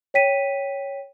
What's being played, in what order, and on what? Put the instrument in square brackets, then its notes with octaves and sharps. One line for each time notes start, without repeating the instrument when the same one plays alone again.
[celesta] C#5 G5 B6 D#7